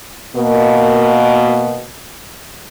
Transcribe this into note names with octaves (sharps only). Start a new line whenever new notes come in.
B2 A#3